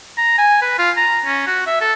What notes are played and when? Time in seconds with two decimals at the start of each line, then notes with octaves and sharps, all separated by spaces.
0.18 A#5
0.38 G#5
0.62 B4
0.79 F4
0.97 A#5
1.26 C#4
1.47 F#4
1.67 E5
1.81 A4